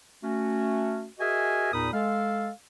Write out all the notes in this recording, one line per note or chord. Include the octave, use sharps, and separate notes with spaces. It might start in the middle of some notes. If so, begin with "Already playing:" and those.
A3 C#4 F#4
F#4 G#4 A#4 D#5 E5 G#5
E2 A#2 D#4 A#4 B5 D#6
G#3 A4 F5